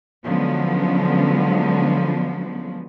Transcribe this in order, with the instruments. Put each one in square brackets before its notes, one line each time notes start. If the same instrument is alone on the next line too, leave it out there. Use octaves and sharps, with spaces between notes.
[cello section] D3 F3 F#3 G#3 B3 C#4